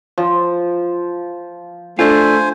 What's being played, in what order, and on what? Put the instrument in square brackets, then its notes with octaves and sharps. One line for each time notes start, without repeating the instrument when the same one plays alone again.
[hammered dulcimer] F3
[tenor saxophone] A3 [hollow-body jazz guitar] D4 F4 [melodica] C5 G#5